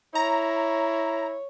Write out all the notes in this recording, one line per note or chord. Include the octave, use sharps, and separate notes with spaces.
E4 C#5 A#5